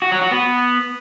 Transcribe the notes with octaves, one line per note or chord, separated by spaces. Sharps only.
F#4
F#3
F#4
B3